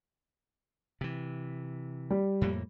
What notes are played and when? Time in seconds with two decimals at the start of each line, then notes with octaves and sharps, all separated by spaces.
1.01 C3 E3
2.10 G3
2.41 F2 A2 A#3